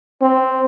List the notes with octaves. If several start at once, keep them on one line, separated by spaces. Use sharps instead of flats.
C4